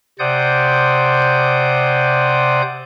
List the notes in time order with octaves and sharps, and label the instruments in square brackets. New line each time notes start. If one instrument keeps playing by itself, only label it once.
[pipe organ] C3 C5 D5 F#5 D#6 G6